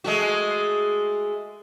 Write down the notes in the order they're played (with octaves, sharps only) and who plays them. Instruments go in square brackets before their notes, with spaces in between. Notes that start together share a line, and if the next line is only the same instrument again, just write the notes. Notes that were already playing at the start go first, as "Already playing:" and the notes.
[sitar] G#3 A3 F#4